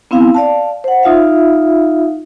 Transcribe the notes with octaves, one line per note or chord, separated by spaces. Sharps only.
B3 C4 E4 F5
D5 F5 A5
C5 F#5
D#4 F4 E5 F5